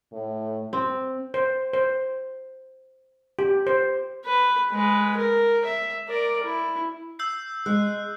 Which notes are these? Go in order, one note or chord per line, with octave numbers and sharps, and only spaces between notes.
A2
C4
C5
C5
G4
C5
B4
G#3 B4
A#4
E5
A#4 D5
E4
E6 G6 C7
G#3 F#6